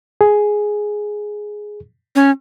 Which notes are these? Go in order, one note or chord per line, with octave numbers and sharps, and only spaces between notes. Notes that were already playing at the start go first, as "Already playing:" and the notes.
G#4
C#4